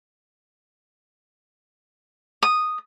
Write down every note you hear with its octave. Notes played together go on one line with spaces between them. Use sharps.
D#6